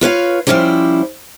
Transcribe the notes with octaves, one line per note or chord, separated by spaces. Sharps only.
F4 B4 C#5 F5
F3 G3 C#4 E4 G4 C5